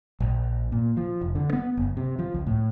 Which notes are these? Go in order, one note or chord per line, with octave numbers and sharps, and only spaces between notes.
A#1
A#2
F3
F1
D3
B3
F#1
C3
F3
C#2
A2